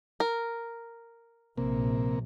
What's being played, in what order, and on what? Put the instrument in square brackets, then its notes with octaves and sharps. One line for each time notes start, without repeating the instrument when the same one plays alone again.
[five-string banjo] A#4
[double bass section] A#1 [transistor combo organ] C3 A#3